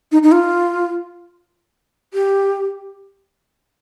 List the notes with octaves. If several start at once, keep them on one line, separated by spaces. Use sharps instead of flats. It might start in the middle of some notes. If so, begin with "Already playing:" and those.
D#4
D#4
F4
G4